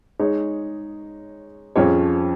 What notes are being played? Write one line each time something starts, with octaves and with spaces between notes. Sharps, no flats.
G#3 D#4 C#5
F2 F3 C#4 G#4 C#5